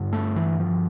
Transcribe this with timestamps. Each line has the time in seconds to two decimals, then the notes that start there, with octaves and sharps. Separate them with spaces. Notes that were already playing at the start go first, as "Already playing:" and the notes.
Already playing: G2 D3
0.13 A3
0.36 E3
0.60 F3